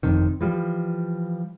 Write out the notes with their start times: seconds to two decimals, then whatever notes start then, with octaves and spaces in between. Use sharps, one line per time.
0.03 G1 F2 C3 D#3
0.41 E3 F3 G3